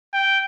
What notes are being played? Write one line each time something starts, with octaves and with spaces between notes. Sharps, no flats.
G5